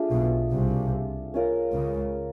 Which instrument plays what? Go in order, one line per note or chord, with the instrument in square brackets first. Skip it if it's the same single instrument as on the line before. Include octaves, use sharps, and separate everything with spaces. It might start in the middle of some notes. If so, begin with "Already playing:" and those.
Already playing: [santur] A3 D4 F4 G#4
[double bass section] B1 B2
C2 C3
[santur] C#4 F4 A#4
[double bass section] C#2 C#3